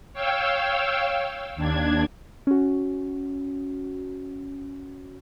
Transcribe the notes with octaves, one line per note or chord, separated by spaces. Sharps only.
C#5 F5 G5 E6
D#2 D4 G#6
C#4 F#4